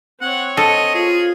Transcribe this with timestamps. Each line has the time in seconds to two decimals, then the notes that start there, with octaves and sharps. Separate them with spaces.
0.21 C4 C#5 F#5
0.57 A4 D#5
0.95 F4 G#4